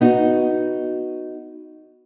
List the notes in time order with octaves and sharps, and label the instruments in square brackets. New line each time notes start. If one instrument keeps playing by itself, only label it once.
[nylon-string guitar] B3 D#4 F#4